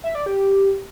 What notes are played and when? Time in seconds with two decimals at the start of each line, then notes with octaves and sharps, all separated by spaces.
0.04 E5
0.15 D5
0.26 G4